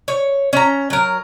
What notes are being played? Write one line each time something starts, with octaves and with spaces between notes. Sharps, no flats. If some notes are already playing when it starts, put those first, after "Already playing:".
C#5
C#4 A#5
F#3 A#4